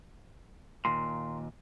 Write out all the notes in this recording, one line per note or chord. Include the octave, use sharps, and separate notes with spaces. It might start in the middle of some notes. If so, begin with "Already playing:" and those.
D#2 A#2 C6